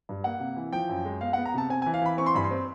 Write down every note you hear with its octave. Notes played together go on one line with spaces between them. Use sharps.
G2
A#3 F#5
C3
E3
F3 G5
F#2
G#3
B3 F5
F#5
B3
A#5
C3 A5
C4 G#5
G#5
E3
F5
E3 B5
C4 C#6
C6
G2 B5
C6
C4